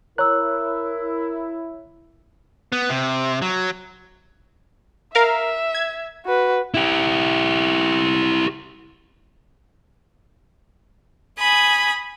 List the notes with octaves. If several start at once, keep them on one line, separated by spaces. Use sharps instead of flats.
E4 A#4 C#5 A#5 E6 F#6
B3
C3
F#3
A#4 E5 F5
G#6
F#4 B4
E4 G4
G#5 B5 D#6